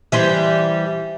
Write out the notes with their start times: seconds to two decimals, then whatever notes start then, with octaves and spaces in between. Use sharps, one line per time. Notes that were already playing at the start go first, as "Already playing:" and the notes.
0.12 E3 G3 C5